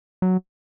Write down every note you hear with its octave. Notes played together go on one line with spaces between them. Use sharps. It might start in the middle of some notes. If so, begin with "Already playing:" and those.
F#3